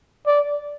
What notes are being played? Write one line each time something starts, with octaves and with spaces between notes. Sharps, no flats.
D5